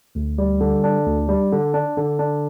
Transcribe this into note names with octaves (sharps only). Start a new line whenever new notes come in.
D2
G3
D3
D4
D2
G3
D3
D4
D3
D4